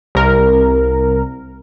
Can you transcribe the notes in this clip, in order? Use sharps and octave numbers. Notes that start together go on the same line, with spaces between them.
C2 A#4